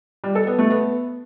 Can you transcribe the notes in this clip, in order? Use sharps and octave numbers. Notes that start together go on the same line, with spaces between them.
G3
A4
B3
A3
B3